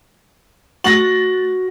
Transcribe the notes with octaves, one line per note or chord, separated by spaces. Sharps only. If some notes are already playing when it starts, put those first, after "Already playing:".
A3 F#4 F#6 A6 A#6 F#7